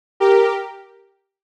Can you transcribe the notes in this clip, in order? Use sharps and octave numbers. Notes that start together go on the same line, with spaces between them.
G4 A#4